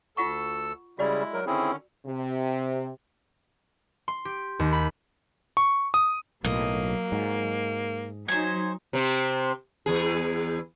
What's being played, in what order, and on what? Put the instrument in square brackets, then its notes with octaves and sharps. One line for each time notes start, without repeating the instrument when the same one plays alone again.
[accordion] D2 A4 E6 [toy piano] F4 F#5 C#6
[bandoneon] C#3 G3 [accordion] G#3 E4 [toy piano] F#4 D5 B5
[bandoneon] F#3 A#4
[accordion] D3 D#3 C#4 [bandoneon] C4 E4 G#4
[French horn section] C3
[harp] C6
G4
D#2
B5
[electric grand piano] C#6
D#6
[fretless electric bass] B1 A2 [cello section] F#3 [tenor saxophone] A#3 [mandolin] D#5
[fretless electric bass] G#2
[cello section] F#3 D#4 [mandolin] C5 G#5
[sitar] C3 C4
E2 G#4